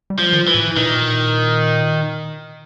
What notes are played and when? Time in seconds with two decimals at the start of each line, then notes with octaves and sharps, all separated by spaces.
0.10 G3
0.19 F3
0.33 D#3
0.48 E3
0.55 A2
0.77 A#2 D#3